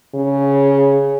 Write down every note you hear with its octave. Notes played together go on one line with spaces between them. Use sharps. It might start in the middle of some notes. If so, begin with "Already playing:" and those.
C#3